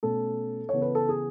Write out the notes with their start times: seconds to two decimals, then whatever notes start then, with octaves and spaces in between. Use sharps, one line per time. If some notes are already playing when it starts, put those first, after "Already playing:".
0.03 B2 A3 C#4 A4
0.69 C#3 E3 B3 C#5
0.82 B4
0.95 A4
1.09 G#4